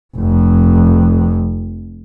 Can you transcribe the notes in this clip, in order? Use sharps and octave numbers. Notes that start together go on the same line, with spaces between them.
F1 F2